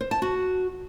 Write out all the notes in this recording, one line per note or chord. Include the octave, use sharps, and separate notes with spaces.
C5
A5
F#4